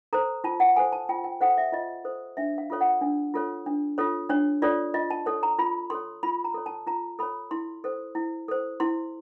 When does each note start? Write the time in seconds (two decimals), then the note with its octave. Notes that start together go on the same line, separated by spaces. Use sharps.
0.13 A4 C5 A#5
0.44 F4 A5
0.60 F#5
0.76 A4 C5 G#5
0.92 A5
1.09 F4 G5
1.24 G5
1.41 A4 C5 F#5
1.57 E5
1.72 F4 D#5
2.05 A4 C5
2.37 D4 E5
2.58 F5
2.70 F4 A4 C#5
2.81 F#5
3.01 D4
3.34 F4 A4 C#5
3.66 D4
3.98 F4 A4 C#5
4.29 D4 C#5
4.62 F4 A4 C#5 D5
4.94 F4 D#5
5.10 A5
5.26 A4 C#5
5.43 A#5
5.58 F4 B5
5.90 A4 C#5 C6
6.23 F4 B5
6.44 A#5
6.54 A4 C#5
6.66 A5
6.87 F4 A#5
7.19 A4 C#5 B5
7.51 E4 C6
7.84 A4 C5
8.15 E4
8.48 A4 C5
8.80 E4 C6